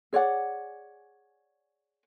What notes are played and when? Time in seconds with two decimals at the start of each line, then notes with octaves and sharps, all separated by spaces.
0.13 G#4 C#5 D5 F#5